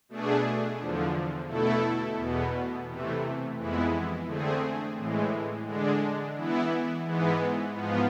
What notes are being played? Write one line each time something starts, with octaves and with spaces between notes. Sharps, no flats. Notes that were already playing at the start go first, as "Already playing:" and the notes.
B2 A3 D4 G#4
E2 D3 F3
B2 A3 E4 A4
E2 B2 B3
C3 E3 A3
F2 E3 G#3 B3 E4
D3 A3 C4 G#4
A2 E3 G#3
D3 G#3 D4
E3 B3 E4
G#2 E3 G#3 B3
G#2 F3 B3 F4